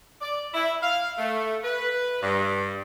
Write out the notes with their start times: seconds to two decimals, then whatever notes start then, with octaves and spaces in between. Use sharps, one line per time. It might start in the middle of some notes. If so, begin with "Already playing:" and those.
0.22 D5
0.54 E4
0.83 F5
1.18 A3
1.64 B4
2.22 G2